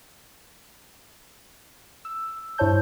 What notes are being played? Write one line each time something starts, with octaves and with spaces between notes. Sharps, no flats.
E6
G2 E4 C5 C#5 A5 G6